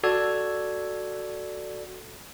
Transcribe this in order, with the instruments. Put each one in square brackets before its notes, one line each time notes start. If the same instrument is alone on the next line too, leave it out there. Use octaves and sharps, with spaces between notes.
[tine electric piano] F#4 A4 D5 E6 G#6